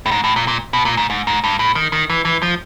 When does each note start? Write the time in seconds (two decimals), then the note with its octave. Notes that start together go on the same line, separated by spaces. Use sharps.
0.06 A2
0.11 G#2
0.24 A2
0.36 A#2
0.48 A#2
0.73 B2
0.85 A#2
0.97 G#2
1.10 G#2
1.27 G#2
1.44 G2
1.59 A2
1.75 D#3
1.92 D#3
2.10 E3
2.25 E3
2.42 F3